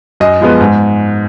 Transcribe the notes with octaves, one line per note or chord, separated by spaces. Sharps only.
F#2 D#5
F3 G#3 B3
G#2